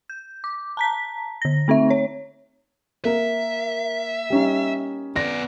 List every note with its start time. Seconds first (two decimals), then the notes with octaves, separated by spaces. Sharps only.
0.10 G6
0.44 D6
0.77 A5 A#5 B6
1.42 D3 A#6
1.68 A3 C4 D#4 E5
1.90 C#5
3.05 A#3 A#4 E5
4.30 G3 C#4 D#4
5.16 B3 D5 A#6